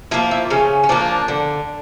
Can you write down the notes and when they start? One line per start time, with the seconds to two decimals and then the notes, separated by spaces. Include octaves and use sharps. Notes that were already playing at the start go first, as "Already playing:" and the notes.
0.11 F3 A#3 E4
0.31 E4
0.50 C#3 C#4
0.84 C#4
0.89 F3 A#3 D4
1.28 D3